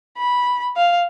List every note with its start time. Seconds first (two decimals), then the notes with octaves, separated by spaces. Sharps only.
0.18 B5
0.76 F5